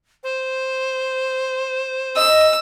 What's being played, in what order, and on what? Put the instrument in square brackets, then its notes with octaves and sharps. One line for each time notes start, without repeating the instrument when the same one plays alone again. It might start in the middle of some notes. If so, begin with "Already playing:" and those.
[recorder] C5
[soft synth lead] D#5 [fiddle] E6